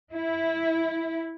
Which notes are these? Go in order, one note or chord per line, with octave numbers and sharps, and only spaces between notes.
E4